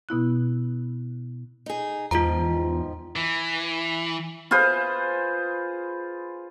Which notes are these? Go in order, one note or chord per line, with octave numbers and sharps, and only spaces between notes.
B2 B3 E4 F#6
D#4 G#4
E2 G#2 D#3 F3 F4 A#5
E3
F4 G#4 B4 C5